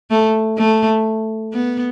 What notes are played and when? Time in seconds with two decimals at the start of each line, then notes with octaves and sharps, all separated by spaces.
0.11 A3
0.58 A3
1.53 B3